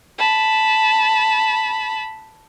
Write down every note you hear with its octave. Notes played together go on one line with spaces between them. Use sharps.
A5 B5